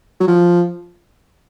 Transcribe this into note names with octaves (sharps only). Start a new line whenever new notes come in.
F#3
F3